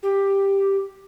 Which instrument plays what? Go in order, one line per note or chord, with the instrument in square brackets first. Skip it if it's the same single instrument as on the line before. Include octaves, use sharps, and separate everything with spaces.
[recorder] G4